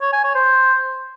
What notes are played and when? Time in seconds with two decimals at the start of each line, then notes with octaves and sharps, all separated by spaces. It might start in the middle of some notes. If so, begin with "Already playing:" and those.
0.02 C#5
0.13 G#5
0.24 C#5
0.35 C5